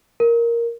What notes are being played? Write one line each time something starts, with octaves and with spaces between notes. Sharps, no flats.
A#4